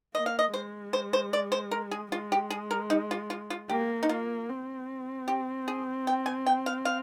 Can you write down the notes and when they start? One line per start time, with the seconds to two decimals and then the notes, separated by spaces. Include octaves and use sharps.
0.15 A#3 D#5
0.26 F5
0.39 D#5
0.54 G#3 C5
0.93 C5
1.13 C5
1.33 D5
1.52 C5
1.71 A#4
1.91 G#4
2.12 G#3 F4
2.32 G4
2.50 G#4
2.71 A#4
2.90 D#4
3.11 F4
3.30 F4
3.50 F4
3.69 A#3 G4
4.03 D#4
4.09 A#3 F4
4.49 C4
5.28 G4
5.68 G#4
6.07 G5
6.26 G#5
6.46 G5
6.66 F5
6.85 F5